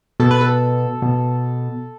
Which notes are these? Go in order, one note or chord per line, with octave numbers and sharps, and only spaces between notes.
B2 A4
B4
A4
B2